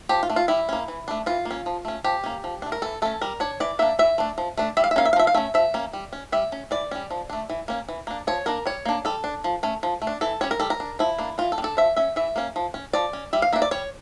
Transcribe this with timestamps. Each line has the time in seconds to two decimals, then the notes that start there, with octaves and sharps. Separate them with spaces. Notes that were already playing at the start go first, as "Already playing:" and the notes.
0.09 F3 G4
0.23 F4
0.30 A3 D4
0.36 F4
0.48 G3 E4
0.69 A#3 C#4
0.88 E3
1.08 A3 D4
1.26 E3 F4
1.45 A#3
1.51 C#4
1.66 F3
1.85 A3 C#4
2.04 F3 G4
2.24 A#3 C#4
2.44 F3
2.62 A3 D4
2.72 A#4
2.82 E3 A4
3.02 A3 C#4 A4
3.21 G3 A#4
3.40 D4 C#5
3.60 E3 D5
3.79 A#3 D4 E5
3.99 E3 E5
4.18 A3 D4
4.38 F3
4.57 A3 D4
4.77 G3 E5
4.84 F5
4.91 E5
4.96 A#3 C#4 F5
5.05 E5
5.13 F5
5.16 F3 E5
5.27 F5
5.34 A3 C#4 E5
5.54 F3 E5
5.74 A#3 C#4
5.93 G3
6.13 C#4
6.32 G3 E5
6.52 C#4
6.71 E3 D5
6.91 G3 C#4
7.10 F3
7.30 A3 D4
7.50 E3
7.68 A#3 C#4
7.88 E3
8.07 A#3 D4
8.27 F3 C#5
8.46 A#3 D4 A#4
8.65 G3 C#5
8.85 A#3 D4
9.05 G3 A4
9.24 D4
9.44 F3
9.63 A3 C#4
9.83 F3
10.02 A3
10.07 D4
10.21 E3 A4
10.41 G3 C#4 C#5
10.51 A#4
10.60 G3 A4
10.70 A#4
10.80 D4
10.99 F3 E4
11.19 A#3 D4
11.38 E3 F4
11.52 A4
11.58 G3
11.62 D4 A4
11.77 F3 E5
11.96 C#4 E5
12.16 E3 E5
12.36 A#3 C#4
12.56 F3
12.74 C#4
12.93 F3 D5
13.13 C#4
13.33 G3 E5
13.42 F5
13.53 A#3 D4 E5
13.62 D5
13.71 G3 C#5